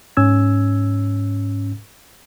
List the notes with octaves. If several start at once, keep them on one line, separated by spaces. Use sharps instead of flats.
G#2 C#4 E6 G#6